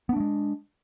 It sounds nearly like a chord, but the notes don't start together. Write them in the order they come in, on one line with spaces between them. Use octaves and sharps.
B3 D4 A3 G#3